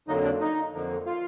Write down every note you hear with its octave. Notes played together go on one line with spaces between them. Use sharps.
F2 D3 F#3 A#3 D#4 D#5
D4 D5
D#4 D#5
F2 D3 F3 A#3
F4 F5